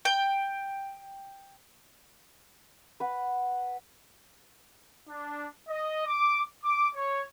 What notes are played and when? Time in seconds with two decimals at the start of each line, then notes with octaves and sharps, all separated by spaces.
0.05 G5 G6
3.00 B4 F#5
5.09 D4
5.69 D#5
6.07 D6
6.64 D6
6.95 C#5